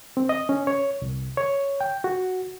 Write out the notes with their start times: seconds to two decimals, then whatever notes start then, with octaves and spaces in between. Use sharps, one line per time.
0.17 C4
0.29 D#5
0.49 C#4
0.67 C#5
1.02 C2
1.37 C#5
1.81 G5
2.04 F#4